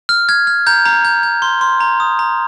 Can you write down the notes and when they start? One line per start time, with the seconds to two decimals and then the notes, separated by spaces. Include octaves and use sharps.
0.09 F6
0.29 F6 G#6
0.47 F6
0.67 A#5 G6
0.86 A#5
1.05 G6
1.23 G6
1.42 C6
1.61 C6
1.80 A#5
2.00 D#6
2.19 A#5